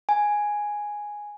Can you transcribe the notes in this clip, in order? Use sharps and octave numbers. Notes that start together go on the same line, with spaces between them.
G#5